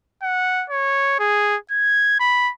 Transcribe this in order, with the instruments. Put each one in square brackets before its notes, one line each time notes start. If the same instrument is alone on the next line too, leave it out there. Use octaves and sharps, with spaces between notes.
[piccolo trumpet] F#5
C#5
G#4
G#6
B5